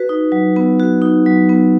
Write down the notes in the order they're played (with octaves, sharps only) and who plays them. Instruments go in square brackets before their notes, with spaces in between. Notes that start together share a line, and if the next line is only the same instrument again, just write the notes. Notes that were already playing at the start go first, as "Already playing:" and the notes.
Already playing: [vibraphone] F#4 B4
D#4
F#3
B3
F#4
D#4
F#3
B3